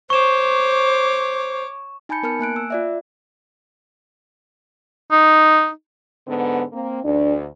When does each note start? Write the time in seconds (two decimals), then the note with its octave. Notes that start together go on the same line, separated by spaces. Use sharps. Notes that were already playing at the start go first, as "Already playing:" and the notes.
0.10 C5 C#5 C#6 D6 E7
2.09 D#4 G#5 A5 B5 G6 C#7
2.23 B3 A#4 A5 F6 C#7
2.39 A#3 G#5 F#6 D7
2.56 E6
2.70 F4 D5 E5
5.11 D#4
6.26 G#2 D3 B3
6.72 A#3 C4
7.04 D2 D4